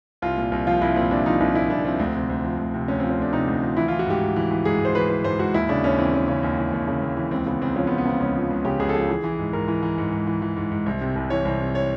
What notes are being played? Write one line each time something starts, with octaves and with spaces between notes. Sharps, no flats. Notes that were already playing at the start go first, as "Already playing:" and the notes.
C2 F4
A#2
C2
F3 F4
C2 E4
A#2 C4
C2 D4
F3 D#4
C2 E4
A#2 E4
C2 D4
F3 C4
D2
C3
D2
F3
D2
C3
D2 C#4
C4
F3
C#4
D2 D4
C3 D#4
D2
F3
E3 E4
F4
E3
F#4
G#2 G4
G#2
E3
E3
G#2 G#4
G#2 C5
E3 B4
E3 B4
G#2 C5
G#2 F#4
D#2 E4
C#3 D4
D#2 C#4
E3 C4
D#2 C#4
C#3 C#4
D#2
E3
D#2
C#3
D#2
E3
C#2 C4
C#3 B3
C#2 C4
F3 C#4
B3
C#2
B3
C#3 C4
C#2 C#4
F3
C#2
C#3 G4
C#2 G#4
A4
F3 G#4
E3
E3
G#2
G#2 A#4
E3
E3
G#2
G#2
E3
E3
G#2
G#2
C2
C3
C2
E3 C#5
C2
C3
C#5